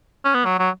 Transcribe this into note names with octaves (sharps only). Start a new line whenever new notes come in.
C#4
B3
F#3
F#3